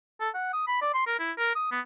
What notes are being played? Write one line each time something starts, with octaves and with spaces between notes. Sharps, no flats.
A4
F#5
D#6
B5
D5
C6
A#4
E4
A#4
D#6
B3